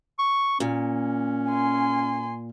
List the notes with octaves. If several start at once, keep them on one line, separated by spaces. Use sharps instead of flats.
C#6
A#2 C#4
G#5 C6